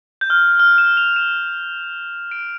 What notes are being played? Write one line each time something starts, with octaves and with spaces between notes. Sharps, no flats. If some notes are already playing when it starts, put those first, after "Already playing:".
G6
F6
F6
E7
F7
E7
D7